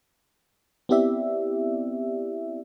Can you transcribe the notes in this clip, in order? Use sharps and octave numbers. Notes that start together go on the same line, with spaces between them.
B3 C4 E4 G4 D5 E5